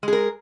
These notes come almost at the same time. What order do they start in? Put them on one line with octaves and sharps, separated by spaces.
G#3 G#4 A#4